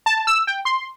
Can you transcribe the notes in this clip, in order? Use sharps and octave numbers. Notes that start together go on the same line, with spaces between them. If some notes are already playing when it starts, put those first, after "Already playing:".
A5
E6
G5
C6